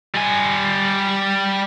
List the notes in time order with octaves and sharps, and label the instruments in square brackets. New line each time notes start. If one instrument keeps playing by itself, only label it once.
[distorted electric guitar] G3 G#5